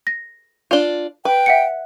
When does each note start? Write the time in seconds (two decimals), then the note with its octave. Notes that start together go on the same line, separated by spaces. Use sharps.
0.07 A#6
0.71 D4 F4 F7 G7
1.25 B4 G5
1.46 E5 F#5 C#7